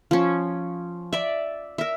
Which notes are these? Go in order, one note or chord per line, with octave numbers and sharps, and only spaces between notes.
F3 C#4
D5 E5
A#4 E5